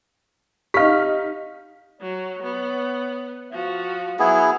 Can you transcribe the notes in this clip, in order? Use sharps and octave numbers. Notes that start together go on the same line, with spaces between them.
D#4 G4 F5 F6 B6
F#3 C#5
B3
F3 F#4 F5
F#3 B3 E4 G#4